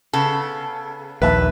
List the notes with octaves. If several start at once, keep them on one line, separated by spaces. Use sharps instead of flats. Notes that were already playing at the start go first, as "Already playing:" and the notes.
C#3 B3 A4
A#1 D#2 B4 E5 A5